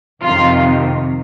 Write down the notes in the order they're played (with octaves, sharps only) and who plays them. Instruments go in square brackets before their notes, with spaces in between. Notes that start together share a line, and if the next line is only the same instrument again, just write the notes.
[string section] F2 C3 D#3 F4